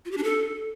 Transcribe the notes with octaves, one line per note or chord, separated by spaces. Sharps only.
F4
G4
D4
A4